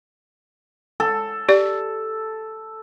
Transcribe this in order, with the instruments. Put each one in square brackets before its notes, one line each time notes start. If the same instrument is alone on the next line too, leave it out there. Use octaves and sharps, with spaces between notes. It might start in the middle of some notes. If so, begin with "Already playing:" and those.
[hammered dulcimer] A4
[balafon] G4 D5